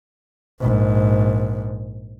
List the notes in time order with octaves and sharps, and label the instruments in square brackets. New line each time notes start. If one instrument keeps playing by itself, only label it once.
[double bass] A#1 G#2